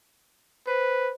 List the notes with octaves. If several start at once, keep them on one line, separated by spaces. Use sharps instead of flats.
B4 C5